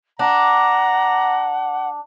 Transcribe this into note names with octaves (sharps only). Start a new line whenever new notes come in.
D4 F#5 A#5